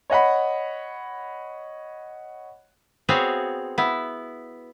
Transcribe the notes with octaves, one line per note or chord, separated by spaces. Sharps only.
C#5 D#5 F#5 B5
B3 C4 F#4 G#4 C#5 F5
B3 E4